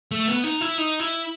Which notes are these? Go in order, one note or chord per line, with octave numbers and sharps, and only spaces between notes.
A3
B3
D#4
E4
D#4
E4